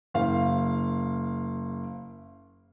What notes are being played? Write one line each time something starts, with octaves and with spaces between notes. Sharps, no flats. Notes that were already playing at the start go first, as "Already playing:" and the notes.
F#1 F5